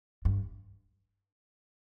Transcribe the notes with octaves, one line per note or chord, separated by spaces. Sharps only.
G2